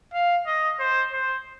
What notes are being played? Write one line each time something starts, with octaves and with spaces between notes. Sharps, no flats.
F5
D#5
C5
C5